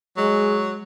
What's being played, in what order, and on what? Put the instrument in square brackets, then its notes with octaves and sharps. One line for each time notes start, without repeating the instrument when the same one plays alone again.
[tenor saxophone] F#3 [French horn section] G#3